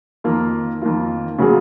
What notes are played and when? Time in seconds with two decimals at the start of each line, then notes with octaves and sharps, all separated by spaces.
0.24 F2 D#3 A#3 F4
0.82 F2 D#3 A#3 F4
1.38 C#3 F#3 A#3 F4 G#4